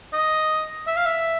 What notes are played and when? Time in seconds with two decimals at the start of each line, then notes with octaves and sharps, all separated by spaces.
0.13 D#5
0.87 E5
0.96 F5
1.05 E5